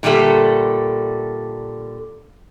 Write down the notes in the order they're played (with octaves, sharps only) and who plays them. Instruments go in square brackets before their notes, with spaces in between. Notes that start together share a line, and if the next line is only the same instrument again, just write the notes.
[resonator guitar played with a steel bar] A#2 D3 G3 A3 A4